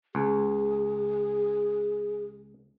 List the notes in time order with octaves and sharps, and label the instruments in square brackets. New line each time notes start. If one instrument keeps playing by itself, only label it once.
[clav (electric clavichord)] C#2 [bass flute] G#4